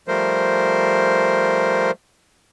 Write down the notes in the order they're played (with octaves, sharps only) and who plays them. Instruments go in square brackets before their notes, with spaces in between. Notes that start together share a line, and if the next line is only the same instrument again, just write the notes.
[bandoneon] F3 G3 A3 A#4 C5